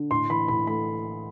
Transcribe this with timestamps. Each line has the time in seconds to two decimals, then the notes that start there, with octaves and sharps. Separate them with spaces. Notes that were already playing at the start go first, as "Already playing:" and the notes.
Already playing: D3
0.11 A2 C6
0.29 E3 B5
0.48 A2 B5
0.67 A3 B5